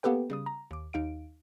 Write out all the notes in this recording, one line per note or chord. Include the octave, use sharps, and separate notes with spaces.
A#3 B3 G4 A4 B4 G5
C#3 G3 D#6
A#5
D#2 D6
D#2 D#4 F5 D7